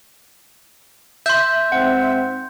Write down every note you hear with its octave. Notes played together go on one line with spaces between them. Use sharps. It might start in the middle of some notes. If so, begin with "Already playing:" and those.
E5 C6 G6
G#2 C4 F#5